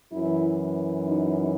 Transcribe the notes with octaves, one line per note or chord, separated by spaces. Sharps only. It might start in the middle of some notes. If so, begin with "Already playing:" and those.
F#2 E3 E4
D#4